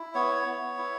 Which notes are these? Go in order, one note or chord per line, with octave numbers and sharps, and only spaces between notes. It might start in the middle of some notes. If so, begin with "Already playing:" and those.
Already playing: E4
B3 C#5
B3
E4